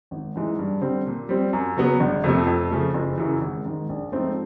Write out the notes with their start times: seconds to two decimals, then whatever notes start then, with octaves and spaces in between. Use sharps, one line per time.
0.11 G#1
0.35 G#2 E3 G#3
0.59 G2
0.82 D3 G3 C4
1.06 A#2
1.29 G3 C4
1.53 F#2
1.77 C#3 F#3 B3
2.00 G1
2.24 F2 C3 F3 A3
2.47 F2
2.71 C#3 F3 A3
2.94 F#1
3.18 F#2 C#3 E3
3.41 G#1
3.66 G#2 D#3
3.89 A#1
4.12 G#2 F3 A3 C4